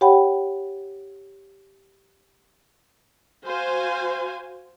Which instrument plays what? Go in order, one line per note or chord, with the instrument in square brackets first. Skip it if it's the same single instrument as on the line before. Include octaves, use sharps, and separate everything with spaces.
[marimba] G4 C#5 F#5 G5 B5
[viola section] F#4 C5 F5 G#5